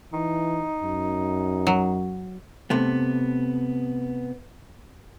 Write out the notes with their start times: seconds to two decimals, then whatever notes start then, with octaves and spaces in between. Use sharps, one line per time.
0.13 E3 D#4
0.83 F#2
1.67 F#3
2.70 C3 A3 B3